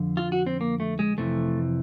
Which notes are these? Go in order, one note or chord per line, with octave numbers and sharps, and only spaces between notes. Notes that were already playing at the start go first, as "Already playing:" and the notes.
Already playing: F2 D3 F3
F4
F#4
C4
A#3
A3
G#3
F2 C3 E3 A3